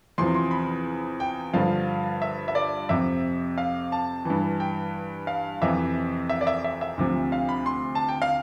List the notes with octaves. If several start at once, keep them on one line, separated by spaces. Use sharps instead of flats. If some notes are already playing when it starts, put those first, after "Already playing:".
E2 C3 F3 C6
C6
B5
G5
G2 D3 F3 F5
E5
E5
D5
F2 C3 F3 E5
F5
A5
G2 E3
G5
F5
F2 C3 E3 E5
E5
D5
E5
E5
E5
D2 C3 F3
F5
B5
C6
A5
G5
F5